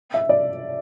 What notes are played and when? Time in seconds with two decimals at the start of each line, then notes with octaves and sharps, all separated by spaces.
0.14 E5
0.29 D5